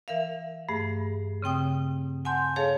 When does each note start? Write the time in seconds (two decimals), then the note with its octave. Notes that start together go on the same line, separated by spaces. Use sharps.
0.08 E3 A#4 E5 F5
0.69 G2 A3 G#4
1.42 C#3 C4 G5 D#6
2.25 F#5 G#5 A5 C6 G6
2.56 G#4 A4 C#5 F5 A5